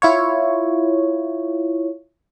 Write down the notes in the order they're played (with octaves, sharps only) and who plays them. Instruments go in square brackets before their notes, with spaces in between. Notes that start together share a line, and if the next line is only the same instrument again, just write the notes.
[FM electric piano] E4 F4 C#5